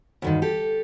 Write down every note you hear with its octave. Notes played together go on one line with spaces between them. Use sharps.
D2 G2 D#3
G4 A4